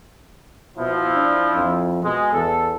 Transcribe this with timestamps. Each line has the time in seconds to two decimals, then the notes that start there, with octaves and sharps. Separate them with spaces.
0.78 B2 F3 E4
1.15 D4
1.55 F2
2.03 B2 G#3
2.33 E2 A4